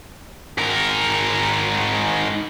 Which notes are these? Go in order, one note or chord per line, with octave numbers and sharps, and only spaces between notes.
G#2 A#4